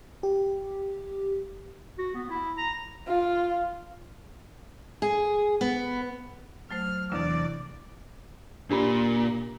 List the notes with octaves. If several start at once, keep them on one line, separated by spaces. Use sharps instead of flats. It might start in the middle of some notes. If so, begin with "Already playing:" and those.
G4
F#4
B3
E4
A#5
F4
G#4
B3
F#3 A3 C5 F6
E2 C3 D4 D5
A#2 D4 G4 B5